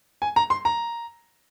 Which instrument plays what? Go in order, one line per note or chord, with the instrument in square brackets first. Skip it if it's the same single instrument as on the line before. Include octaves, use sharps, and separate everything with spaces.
[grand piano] G#5
A#5
C6
A#5